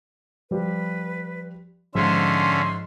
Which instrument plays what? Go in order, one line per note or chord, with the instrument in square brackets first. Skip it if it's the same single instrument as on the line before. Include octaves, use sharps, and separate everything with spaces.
[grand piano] F3 G3 [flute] B4
[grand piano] G#2 F3 [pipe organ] D3 C#4 E5 [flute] C6